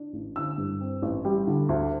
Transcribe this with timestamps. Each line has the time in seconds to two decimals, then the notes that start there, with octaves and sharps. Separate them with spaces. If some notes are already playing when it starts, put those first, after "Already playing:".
Already playing: D4
0.13 A1
0.36 D3 E6
0.58 G2
0.81 C4
1.02 A1
1.25 G3
1.47 D3
1.69 D2